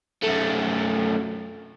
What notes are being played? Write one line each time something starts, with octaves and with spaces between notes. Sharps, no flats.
F#2 A3